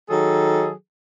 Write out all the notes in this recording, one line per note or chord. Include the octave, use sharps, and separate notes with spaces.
D#3 F#3 G#4 A4